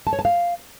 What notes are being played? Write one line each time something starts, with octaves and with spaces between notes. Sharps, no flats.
A5
C#5
A5
F5